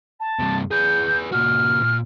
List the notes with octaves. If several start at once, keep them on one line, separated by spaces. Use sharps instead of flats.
A5
G2 C3
G#4 B4 G6
A#2 F#4 F6
A#2